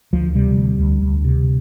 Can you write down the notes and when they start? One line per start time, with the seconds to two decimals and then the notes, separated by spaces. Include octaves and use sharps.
0.13 D2 F3
0.35 C3 G3
0.57 D2
0.79 D2
1.02 D2
1.25 C3